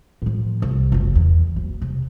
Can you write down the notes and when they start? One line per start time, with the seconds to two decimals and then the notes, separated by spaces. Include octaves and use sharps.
0.22 A2 F3
0.62 C2
0.92 F#1 C#3
1.15 E2
1.56 F#1
1.82 C3